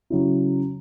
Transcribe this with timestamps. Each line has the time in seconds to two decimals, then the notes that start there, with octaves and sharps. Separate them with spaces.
0.10 C#3 F#3 C#4 E4